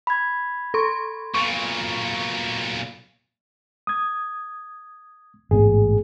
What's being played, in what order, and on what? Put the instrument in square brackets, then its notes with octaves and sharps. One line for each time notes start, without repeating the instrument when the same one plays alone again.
[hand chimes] B5 G#6
[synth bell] A4 C6 C#6
[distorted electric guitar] B1 A#2 [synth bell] C#6
[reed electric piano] D#6 G#6
[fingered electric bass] A1 G#2 B3 [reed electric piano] G#4